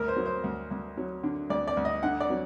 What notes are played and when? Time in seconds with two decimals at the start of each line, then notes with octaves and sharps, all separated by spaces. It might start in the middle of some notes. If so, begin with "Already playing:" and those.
Already playing: D2 A#4
0.08 C5
0.16 F#3
0.26 C5
0.44 D2
0.71 D2
0.97 F#3
1.23 D3
1.50 D2 D5
1.68 D5
1.77 D2
1.85 D#5
2.03 D3 F#5
2.20 D5
2.30 F#3